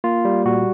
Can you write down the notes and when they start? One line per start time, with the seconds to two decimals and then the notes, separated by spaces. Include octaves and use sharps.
0.04 A#3 F4
0.25 G3
0.46 A#2 F#4